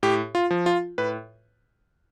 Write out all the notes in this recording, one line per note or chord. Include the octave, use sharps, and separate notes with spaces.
A2 G4
F4
F3
F4
A2 B4